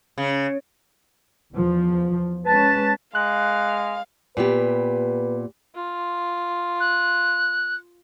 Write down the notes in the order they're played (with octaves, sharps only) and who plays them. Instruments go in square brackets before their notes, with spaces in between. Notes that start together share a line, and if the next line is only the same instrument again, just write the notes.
[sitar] C#3
[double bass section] E2 F3
[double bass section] G#3 C#4 [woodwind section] B4 A5
[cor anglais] G#3 [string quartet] F5 [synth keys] F#6
[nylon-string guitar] A#2 B3 G4 [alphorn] B4
[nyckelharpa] F4
[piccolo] F#6